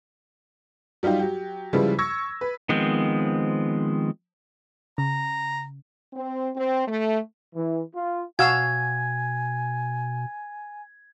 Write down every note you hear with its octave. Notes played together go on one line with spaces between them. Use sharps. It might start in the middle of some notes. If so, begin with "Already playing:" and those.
F#3 G3 D#4 F4 G4
F#3 G4
C#3 F3 G3 G#3 E4 B4
C#6 E6 G#6 A#6
B4
D#3 F3 G#3 B3 C4
C#3 A#5
C4
C4
A3
E3
F4
B2 F#4 F5 G#5 E6 G#6